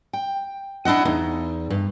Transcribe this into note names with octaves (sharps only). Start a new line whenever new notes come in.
G5
D4 E4 D#5 F#5
E2 D#4
G2